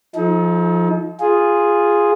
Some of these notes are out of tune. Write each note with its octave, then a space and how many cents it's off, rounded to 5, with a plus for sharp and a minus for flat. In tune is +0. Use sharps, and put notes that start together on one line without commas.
F3 +0 D#4 +25 A4 -35
F4 +0 G#4 -5